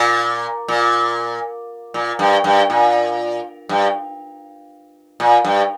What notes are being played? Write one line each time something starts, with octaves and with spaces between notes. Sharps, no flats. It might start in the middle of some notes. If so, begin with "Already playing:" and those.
Already playing: A#2
A#2
A#2
G2
G2
A#2
G2
A#2
G2